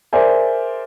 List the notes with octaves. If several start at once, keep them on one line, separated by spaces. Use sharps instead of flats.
G#4 A#4 C5 D5 E5 G#5